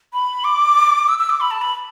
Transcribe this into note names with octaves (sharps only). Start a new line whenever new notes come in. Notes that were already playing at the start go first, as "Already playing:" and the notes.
B5
D6
E6
E6
D6
B5
A5
B5